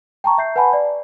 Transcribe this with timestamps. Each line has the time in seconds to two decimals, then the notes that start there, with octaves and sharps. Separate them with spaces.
0.24 G5 A5 A#5 C#6
0.38 E5 G6 C7
0.56 B4 F#5 G#5 A5 B5
0.73 D5